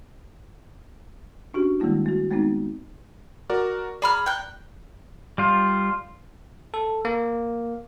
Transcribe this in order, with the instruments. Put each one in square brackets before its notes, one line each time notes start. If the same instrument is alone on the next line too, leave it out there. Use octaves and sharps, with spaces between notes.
[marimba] C#4 D4 F#4 G4
D#3 G3 G#3 A#3 E4
A3 F#4
G#3 A3 B3 C4 D#4
[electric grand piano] F#4 A#4 D5
[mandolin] G#4 B5 F6 [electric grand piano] D5 A#5
[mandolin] G5 F#6
[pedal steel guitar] G3 F4
[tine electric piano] A4
A#3